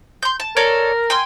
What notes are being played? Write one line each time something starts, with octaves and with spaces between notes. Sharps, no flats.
C6 G6
A5
A4 A#4 C#5 D5
G5 G#5 C6